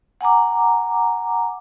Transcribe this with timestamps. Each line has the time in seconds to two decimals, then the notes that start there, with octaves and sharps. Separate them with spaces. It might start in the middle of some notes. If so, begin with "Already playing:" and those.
0.21 F#5 G#5 A#5 D6